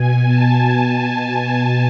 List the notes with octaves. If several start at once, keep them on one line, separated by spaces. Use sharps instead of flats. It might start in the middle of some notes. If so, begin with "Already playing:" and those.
Already playing: B2 G#5
A5
A5